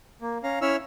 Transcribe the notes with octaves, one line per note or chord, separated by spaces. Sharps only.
A#3
C#4 F5 A#5
C#4 E4 C#5 E5 E6 F6